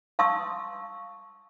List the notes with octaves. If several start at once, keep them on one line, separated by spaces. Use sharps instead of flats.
F5 A5 C6 C#6 D#6 E6